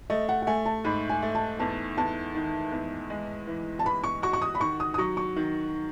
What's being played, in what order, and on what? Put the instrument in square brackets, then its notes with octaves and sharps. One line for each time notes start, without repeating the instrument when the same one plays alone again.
[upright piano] A3 [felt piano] D#5
[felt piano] F#5
F#5
[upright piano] A3 [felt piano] G#5
[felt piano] A5
[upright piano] G#2 [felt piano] B5
[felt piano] G#5
[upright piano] A3
[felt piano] A5
[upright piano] E2 [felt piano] A5
[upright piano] E2 [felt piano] A5
[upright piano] D#3
E2
G#3
E3
[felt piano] A5
[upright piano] E3 [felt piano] B5
[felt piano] C#6
[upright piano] F#4 [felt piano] C#6
[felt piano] C#6
D#6
B5
[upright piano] D#3 [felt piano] C#6
[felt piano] D#6
D#6
[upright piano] F#3 [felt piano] C#6
[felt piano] C#6
[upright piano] D#3